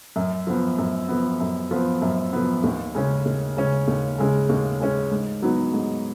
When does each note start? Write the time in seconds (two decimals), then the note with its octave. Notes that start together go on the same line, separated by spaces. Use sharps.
0.16 F#2
0.47 F3 B3
0.78 F#2
1.09 F3 B3
1.40 F#2
1.71 F3 B3
2.02 F#2
2.33 F3 B3
2.63 D#2
2.95 C#3 G#3 C#4
3.25 D#2
3.57 C#3 G#3 C#4
3.87 D#2
4.18 C#3 G#3 C#4
4.49 D#2
4.80 C#3 G#3 C#4
5.11 G#2
5.42 F#3 B3 D#4
5.73 G#2